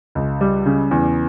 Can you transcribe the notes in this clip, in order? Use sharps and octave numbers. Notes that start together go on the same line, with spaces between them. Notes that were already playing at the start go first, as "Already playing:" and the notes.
C#2
G3
C#3
E2